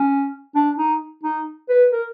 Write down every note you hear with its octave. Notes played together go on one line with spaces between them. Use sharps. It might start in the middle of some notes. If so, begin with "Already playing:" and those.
Already playing: C#4
D4
D#4
D#4
B4
A#4